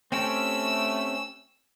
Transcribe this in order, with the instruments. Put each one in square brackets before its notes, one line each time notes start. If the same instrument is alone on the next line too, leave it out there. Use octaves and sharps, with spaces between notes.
[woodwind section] A3 [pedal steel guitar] C4 C#4 G4 [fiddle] E6